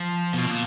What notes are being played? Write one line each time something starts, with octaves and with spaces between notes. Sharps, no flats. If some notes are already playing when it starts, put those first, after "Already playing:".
Already playing: F3
B2
A#2